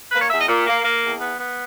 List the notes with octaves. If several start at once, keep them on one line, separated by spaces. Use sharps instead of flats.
A#3 B4
C#5
E2 E5
D#5
A#2
A#3
A#3
E2
B3
B3